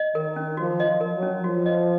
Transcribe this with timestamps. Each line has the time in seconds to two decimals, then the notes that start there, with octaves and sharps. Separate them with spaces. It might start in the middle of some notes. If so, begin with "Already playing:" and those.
Already playing: D#5
0.15 D#3 A#4
0.36 C#4
0.57 F3 F#4
0.80 D#5
0.87 F3
1.01 A#4
1.15 F#3
1.22 C#4
1.44 F3 F#4
1.66 D#5